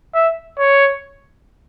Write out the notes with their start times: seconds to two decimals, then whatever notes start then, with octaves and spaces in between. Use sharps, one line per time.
0.14 E5
0.58 C#5